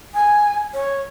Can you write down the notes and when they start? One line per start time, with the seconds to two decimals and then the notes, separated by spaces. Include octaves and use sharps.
0.14 G#5
0.74 C#5